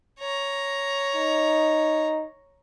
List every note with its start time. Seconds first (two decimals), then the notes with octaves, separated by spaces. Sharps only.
0.18 C#5 A#5
1.15 D#4